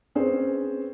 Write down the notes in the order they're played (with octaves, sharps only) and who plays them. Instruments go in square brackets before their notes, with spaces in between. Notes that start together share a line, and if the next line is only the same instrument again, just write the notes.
[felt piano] C4 C#4 G#4 B4 C5